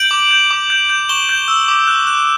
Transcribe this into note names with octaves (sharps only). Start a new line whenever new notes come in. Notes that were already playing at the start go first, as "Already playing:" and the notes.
Already playing: G6 D7 F#7
D6
G6
D6
G6
G6
C#6 E7 G7
G6
E6
D6
F#6
F#6